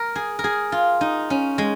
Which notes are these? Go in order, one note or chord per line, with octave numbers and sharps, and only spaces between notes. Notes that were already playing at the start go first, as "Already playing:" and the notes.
Already playing: A#4
G#4
A#4
G#4
F4
D#4
C#4
G#3